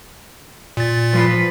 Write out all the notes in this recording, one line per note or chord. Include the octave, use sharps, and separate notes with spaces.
A#2 A6
F3 B4